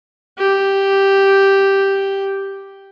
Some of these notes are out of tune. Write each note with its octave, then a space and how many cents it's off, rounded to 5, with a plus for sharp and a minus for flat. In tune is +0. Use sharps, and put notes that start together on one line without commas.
G4 +0